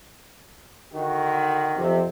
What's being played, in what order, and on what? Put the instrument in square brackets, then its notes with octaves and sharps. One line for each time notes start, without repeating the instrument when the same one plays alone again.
[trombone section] D3 D#3 F#4
[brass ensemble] F2 C3